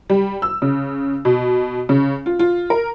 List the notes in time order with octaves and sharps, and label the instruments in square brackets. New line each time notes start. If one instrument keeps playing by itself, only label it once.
[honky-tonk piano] G3
E6
C#3
B2
C#3
F4
F4
A#4